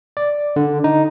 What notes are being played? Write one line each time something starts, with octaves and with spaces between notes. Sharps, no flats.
D5
D3
D#4